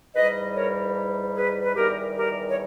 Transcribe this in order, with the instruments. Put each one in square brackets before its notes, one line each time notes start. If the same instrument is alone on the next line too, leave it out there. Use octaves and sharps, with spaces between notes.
[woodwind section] G#2 E3 G3 B4 D#5
A#4 C#5
G#4 B4
B4
E2 D#3 G3 G4 A#4
G4 A#4
C#5